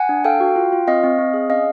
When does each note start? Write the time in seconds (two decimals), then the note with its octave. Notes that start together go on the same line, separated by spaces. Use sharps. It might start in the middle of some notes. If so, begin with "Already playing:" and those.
Already playing: F#5 G#5
0.09 D4
0.24 A4 F5 G5
0.40 F#4
0.56 F4
0.72 F4
0.87 C4 D#5 F5
1.04 C4
1.19 C4
1.34 G#4
1.49 C#4 D#5 F5